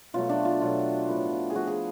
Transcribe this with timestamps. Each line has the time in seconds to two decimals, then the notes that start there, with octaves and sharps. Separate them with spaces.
0.14 B2 F#3 A3 F4
0.29 D4
0.45 F4
0.61 B2 F#3 A3 F4
1.08 A2 F3 B3
1.50 G#4
1.55 A2 F3 B3 F#4
1.67 G#4